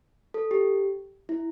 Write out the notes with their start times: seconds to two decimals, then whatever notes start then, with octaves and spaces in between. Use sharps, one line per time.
0.34 A4
0.51 G4
1.29 E4